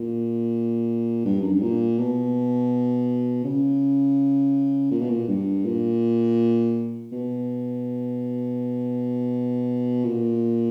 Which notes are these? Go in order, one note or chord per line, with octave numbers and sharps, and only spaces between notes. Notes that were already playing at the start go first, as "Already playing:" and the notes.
Already playing: A#2
G2
F#2
G2
A#2
B2
C#3
A#2
B2
A#2
G2
A#2
B2
A#2